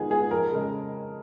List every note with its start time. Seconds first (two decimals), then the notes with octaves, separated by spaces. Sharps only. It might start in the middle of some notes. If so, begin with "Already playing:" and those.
Already playing: D#3 G#3 B3 F4 G#4
0.10 G#3 B3 F4 G#4
0.31 F2 A#4
0.51 C#3 G#3